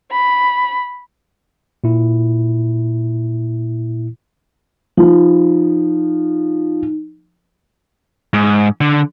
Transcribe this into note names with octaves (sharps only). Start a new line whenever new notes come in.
B5
A#2 E4
F3 D#4
G#2
D3